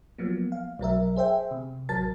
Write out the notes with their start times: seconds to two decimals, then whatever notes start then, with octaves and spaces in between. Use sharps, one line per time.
0.18 F3 F#3 A#3 B3
0.52 F5
0.79 B1 F#3 A#4 E5
1.16 G#4 C5 E5 G5
1.51 C3
1.89 A1 F#3 A#4 A5 A6